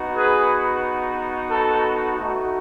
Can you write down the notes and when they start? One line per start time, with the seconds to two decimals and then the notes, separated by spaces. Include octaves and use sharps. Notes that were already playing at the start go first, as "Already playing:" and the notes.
Already playing: B3 D#4 F#4
0.17 G#4 B4
1.49 A4
2.16 A3 D#4 F#4